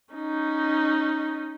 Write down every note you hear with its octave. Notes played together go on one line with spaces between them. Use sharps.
C#4 D#4